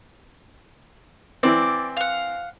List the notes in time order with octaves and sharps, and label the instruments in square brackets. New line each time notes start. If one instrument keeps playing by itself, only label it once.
[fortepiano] E3 C4 [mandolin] D5
[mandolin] F5 F#5